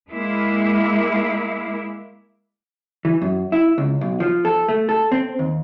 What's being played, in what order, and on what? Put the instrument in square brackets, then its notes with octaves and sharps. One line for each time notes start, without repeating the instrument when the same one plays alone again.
[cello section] G#3 A#3 E4
[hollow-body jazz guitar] E3
F#2
E4
C#2
B1
F3
A4
A3
A4
C4
D#2